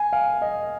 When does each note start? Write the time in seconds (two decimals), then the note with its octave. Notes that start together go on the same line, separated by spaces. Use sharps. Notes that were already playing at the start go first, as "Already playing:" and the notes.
Already playing: G#5
0.13 F5
0.42 D#5